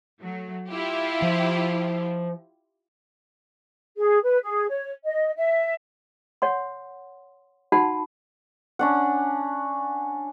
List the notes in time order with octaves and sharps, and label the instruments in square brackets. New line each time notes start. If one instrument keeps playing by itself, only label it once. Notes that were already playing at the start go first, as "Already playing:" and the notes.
[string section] F#3 A3
E4 F4 G4
[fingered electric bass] F3
[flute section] G#4
B4
G#4
C#5
D#5
E5
[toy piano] C#5 F#5 C6
D#4 F#4 F#5 A5 B5
[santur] C#4 D4 F#5